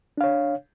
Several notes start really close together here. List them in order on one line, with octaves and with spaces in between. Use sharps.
D4 F5 C#5